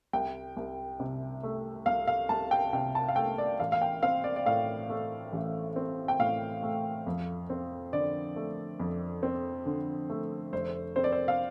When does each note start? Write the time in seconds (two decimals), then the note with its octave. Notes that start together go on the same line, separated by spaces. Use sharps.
0.13 C2 G5
0.57 C2
1.00 C3
1.43 A3
1.86 C2 F5
2.08 F5
2.29 C2 A5
2.51 G5
2.73 C3 G5
2.95 A5
3.08 F5
3.16 A3 G5
3.38 D5
3.60 A1 F5
3.72 F5
3.82 G5
4.03 C4 F5
4.24 D5
4.36 D5
4.46 A2 F5
4.89 A3
5.33 A1
5.76 C4
6.08 G5
6.19 A2 F5
6.63 A3
7.07 F2
7.50 C4
7.93 D3 D5
8.36 A3
8.80 F2
9.23 C4
9.66 D3
10.10 A3
10.53 F1 C5
10.96 C4 C5
11.04 D5
11.12 C5
11.28 F5